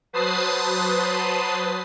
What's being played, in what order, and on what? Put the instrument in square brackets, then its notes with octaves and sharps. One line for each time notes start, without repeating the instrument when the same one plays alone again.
[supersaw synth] F#3 B4 C5 A5 D#6 C7